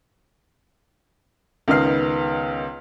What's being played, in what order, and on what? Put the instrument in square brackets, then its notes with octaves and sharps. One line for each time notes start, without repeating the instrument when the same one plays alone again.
[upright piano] C#2 D#3 B3 D#5 F6 C7